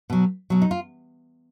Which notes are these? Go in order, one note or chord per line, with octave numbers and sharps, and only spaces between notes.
B2 F#3
B2 F#3
D#4
F4